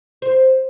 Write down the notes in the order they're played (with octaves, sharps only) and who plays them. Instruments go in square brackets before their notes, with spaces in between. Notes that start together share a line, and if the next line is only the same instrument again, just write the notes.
[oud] C5